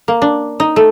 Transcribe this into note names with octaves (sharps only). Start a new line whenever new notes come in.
A#3
D4
D#4
A3